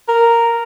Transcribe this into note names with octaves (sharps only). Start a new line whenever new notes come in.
A#4